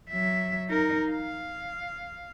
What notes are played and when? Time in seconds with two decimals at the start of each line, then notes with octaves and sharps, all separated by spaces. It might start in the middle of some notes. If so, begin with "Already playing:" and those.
0.11 F#3 E5
0.69 D#4 A#4
1.10 F5